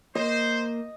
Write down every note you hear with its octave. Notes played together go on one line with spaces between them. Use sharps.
A#3 C5 D#5